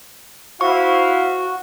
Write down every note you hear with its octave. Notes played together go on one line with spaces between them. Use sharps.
E4 F#4 C5 F5 C#6